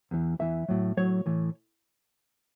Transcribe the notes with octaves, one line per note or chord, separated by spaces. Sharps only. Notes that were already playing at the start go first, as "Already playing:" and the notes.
E2 E3
E2 E3 E5
A2 F#3
A2 F#3 C#5
A2 E3